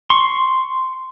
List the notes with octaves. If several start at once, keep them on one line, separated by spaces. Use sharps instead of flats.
C6 C#6